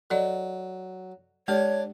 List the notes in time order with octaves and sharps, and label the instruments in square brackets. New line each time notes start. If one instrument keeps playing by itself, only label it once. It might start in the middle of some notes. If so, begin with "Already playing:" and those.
[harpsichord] F#3 [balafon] A4 D5 D#5
[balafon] G#3 G4 A4 [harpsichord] D4 [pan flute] C#5